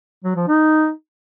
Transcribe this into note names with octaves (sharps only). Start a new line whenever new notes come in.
F#3
F3
D#4